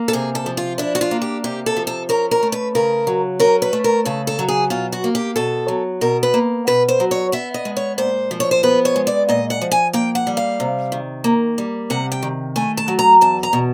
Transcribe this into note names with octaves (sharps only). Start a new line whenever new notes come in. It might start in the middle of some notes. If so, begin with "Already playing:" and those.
Already playing: A#3
A4
C3 G#4
A4
F3
F4
D4 E4
F#4
F4
A#3
G4
C3 G4
A4
F3
A4
C#4 A#4
A#4
A3
B4
C#3 A#4
F#3
C#4 A#4
B4
A3
A#4
C#3 A4
A4
F#3
G#4
B2 F4
F#4
A#3
G4
B2 A4
F#3
B2 A#4
B4
A#3
B2 B4
C5
F#3
C#5
B3 E5
D#5
G#3
C#5
A#2 C5
F3
C#5
C5
B3 B4
C#5
G#3
D5
A#2 D#5
F#5
F3
G#5
A#3 G5
F#5
G3
F5
C3
D#3
A#3
G3
C3 F#5
G5
D#3
A3 G#5
A5
F#3
A#5
E2 A5
A#5
B2